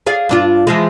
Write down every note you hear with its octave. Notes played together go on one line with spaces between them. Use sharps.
G#4 D5 F5
G2 D4 F4
E3 F3 G#3